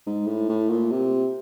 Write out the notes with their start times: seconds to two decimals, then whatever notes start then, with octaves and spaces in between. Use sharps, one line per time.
0.07 G#2
0.27 A2
0.49 A2
0.70 A#2
0.91 C3